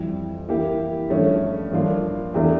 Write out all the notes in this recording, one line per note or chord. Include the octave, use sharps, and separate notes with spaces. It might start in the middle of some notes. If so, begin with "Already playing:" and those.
Already playing: F2 E3 G3
E3 A#3 E4 G4
G2 F3 A3 C#4
G2 F3 A#3 D4 F4
E2 E3 A3 D4 G4